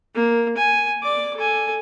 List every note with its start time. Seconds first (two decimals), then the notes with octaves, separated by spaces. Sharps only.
0.15 A#3
0.57 G#5
1.03 D5 D6
1.36 A4 G#5